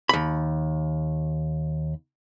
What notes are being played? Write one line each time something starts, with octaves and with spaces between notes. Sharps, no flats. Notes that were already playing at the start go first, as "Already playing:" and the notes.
D#2 B5